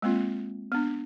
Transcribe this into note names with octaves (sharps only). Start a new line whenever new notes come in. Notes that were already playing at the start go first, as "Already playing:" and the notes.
G#3 A#3 C4 F4
B3 D4